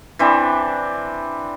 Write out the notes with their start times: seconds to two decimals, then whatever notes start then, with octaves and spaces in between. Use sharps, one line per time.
0.19 E3 C4 D4 E4